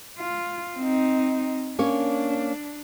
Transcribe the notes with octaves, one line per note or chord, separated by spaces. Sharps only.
F4
C4 D#4
A#3 C#4 D4 C#5